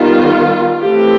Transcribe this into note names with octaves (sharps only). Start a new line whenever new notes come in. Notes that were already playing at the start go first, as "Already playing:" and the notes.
Already playing: D#3 G3 B3 F4
E3 A3 C4 G4